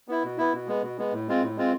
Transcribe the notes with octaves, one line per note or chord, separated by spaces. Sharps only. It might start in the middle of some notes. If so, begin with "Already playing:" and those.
B3 E4
B2
B3 E4
B2
G#3 B3
B2
G#3 B3
A2
G#3 C4 F4
A2
G#3 C4 F4